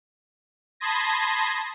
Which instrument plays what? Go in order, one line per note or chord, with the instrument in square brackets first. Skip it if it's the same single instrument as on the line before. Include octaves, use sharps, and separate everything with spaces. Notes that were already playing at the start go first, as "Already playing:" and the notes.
[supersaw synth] A5 B5 C6 D#6 G#6 A#6